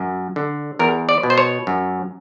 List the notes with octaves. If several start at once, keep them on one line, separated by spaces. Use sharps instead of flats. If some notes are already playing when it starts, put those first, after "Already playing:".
Already playing: F#2
D3
E2 A#4
D5
B2
C5
C#5
F#2